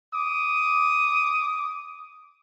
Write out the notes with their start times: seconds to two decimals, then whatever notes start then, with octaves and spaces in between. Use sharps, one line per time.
0.14 D6 D#6